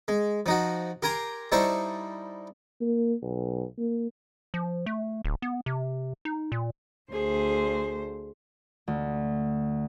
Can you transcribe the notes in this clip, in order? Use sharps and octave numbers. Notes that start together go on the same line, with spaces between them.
G#3
F3 D#4 F#4
G4 A#4 G#5 A#5 C6
G3 D#4 E4 C5 A5 C#6
A#3
B1
A#3
F3
A3
D1
B3
C3
D#4
A#2
D2 G#4 C5
D2